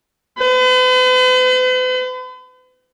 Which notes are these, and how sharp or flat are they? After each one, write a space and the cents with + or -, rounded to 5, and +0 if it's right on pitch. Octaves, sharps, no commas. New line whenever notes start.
B4 +45